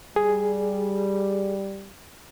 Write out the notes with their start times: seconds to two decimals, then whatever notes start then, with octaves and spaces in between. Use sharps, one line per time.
0.16 G3 G#4